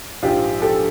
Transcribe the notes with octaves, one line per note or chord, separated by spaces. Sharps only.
A#1 G#2 F3 F4 G4
G4 A4